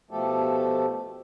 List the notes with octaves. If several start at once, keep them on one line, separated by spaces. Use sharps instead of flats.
B2 F3 A3 G4 A4